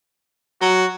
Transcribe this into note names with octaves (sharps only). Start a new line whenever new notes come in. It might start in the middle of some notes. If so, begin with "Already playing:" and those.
F#3 F#4